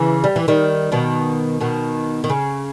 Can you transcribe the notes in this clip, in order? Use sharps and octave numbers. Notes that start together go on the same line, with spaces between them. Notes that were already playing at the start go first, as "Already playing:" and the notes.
Already playing: C#3 E3
G3
E3
D#3 G3
B2 D#3
B2 D#3
D#3
C#3